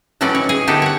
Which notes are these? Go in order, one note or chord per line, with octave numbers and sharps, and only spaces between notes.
A2 E3 F#3 C#4 D#4 D5
C#5
G#4
D3 B3 D#4 E4 G4 A4
C#5 F#5